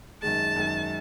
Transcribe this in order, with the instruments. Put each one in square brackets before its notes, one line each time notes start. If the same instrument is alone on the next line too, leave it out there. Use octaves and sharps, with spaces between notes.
[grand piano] F#2 D#3 G#3 [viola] A5
[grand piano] F#2 D#3 G#3